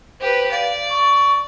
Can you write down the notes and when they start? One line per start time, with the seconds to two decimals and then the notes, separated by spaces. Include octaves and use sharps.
0.20 G4 B4 C5
0.51 D5 F5
0.90 C#6